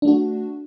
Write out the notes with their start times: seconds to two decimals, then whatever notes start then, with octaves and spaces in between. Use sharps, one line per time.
0.02 D4
0.05 A3
0.08 F#4